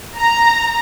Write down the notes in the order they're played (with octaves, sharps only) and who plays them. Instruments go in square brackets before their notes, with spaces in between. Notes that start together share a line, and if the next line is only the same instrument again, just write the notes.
[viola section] A#5